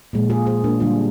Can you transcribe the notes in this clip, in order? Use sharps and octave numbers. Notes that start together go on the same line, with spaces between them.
A#2 F3 G#3
F4 G#4
G#4 C5
A#3 D4
D3 G3 A#3 D4 F4